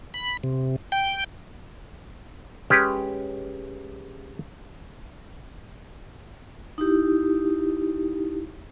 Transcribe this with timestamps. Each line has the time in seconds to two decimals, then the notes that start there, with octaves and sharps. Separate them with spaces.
0.14 B5
0.44 C3
0.92 G5
2.70 G#3 C#4 G4 B4
6.78 D#4 E4 G4